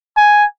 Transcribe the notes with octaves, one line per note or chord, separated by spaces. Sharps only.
G#5